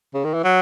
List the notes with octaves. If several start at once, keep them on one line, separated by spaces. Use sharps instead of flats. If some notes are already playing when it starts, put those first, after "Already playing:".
C#3
D#3
E3
F#3